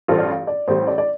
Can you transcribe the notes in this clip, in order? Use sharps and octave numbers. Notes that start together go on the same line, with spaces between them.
A1 G2 G3 F4 A4 C5
D5
F5
D5
A1 A2 G3 C5
D5
D5